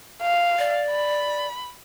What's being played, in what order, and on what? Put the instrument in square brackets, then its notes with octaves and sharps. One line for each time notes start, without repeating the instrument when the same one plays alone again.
[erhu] F5
[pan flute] D5
[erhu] B5